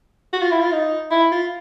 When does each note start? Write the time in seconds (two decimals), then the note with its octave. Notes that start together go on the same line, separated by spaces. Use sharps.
0.33 F#4
0.42 F4
0.51 E4
0.60 F4
0.72 D#4
1.11 E4
1.32 F4